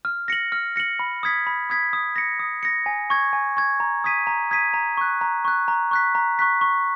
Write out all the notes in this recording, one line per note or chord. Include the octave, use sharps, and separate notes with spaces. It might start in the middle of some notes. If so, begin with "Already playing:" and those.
F6
A#6 C#7 F#7
F6
A#6 C#7 F#7
B5
D#6 G#6 B6
B5
D#6 G#6 B6
D#6
A#6 C#7
D#6
A#6 C#7
G#5
C#6 G#6
G#5
C#6 G#6
A#5
D#6 G#6 B6 D#7
A#5
D#6 G#6 B6 D#7
A#5
C#6 F#6
A#5
C#6 F#6
A#5
C#6 F#6 B6
A#5
C#6 F#6 B6
C#6